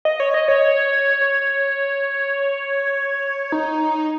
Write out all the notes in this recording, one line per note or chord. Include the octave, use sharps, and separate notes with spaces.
D#5
C#5
D#5
C#5
C#5
D#4